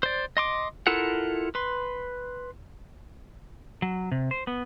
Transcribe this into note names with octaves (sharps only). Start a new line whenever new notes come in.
C5 D5
D#5 C6 D6
E4 F4 A4 A#4 F#5
B4 C6
F#3
C3
C5
B3